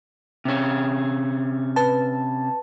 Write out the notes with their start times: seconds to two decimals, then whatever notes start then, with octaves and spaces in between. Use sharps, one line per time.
0.45 C3 C#4
1.76 B4 A5